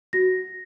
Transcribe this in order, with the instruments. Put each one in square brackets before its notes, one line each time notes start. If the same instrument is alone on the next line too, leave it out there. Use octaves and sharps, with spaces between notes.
[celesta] F#4 A#6